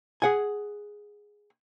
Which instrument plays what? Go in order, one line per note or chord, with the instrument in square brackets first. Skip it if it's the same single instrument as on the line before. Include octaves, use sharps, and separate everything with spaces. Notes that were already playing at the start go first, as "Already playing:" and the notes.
[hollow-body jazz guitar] G#4 F#5 G#5